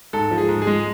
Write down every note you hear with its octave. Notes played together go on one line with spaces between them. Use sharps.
G#2 A4
F3
G#4
G#2
G#4
G#3